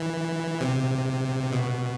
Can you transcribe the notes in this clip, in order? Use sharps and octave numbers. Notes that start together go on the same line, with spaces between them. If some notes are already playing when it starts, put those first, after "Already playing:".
Already playing: E3
C3
B2